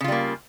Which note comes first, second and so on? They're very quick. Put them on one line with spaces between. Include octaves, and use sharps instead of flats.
C#3 F4 G3 A#3